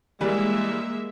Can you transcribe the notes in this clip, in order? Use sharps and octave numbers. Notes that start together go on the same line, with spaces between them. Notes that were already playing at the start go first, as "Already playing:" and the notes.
E3 G3 G#3 A#3 E5